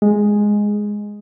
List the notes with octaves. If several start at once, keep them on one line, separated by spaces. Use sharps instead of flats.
G#3